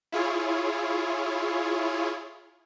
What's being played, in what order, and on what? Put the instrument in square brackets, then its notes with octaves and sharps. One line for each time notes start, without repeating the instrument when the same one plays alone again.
[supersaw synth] E4 F4 G#4 C#5